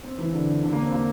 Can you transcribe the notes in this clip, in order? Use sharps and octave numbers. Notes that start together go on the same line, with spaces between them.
C4
E3
D3
D3
D3
A#3
C4
A#3